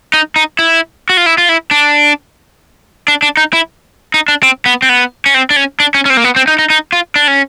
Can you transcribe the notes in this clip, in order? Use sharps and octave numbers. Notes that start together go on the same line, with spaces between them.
D#4
D#4
E4
F#4
F4
E4
F4
E4
D4
D4
D4
D#4
E4
D#4
D4
C4
B3
C4
B3
C#4
C4
D4
C#4
D4
C#4
C#4
C4
A#3
B3
C4
D#4
D#4
D#4
F4
D4
C#4